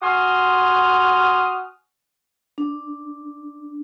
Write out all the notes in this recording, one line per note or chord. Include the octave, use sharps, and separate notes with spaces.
F#4 G#5 C6 D#6 F6
D4